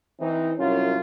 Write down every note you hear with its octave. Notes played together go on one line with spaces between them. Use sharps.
E3 C4 D#4
C2 F#2 C#4 F4